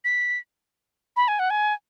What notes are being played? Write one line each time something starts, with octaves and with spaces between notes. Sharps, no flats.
B6
B5
G#5
F#5
G#5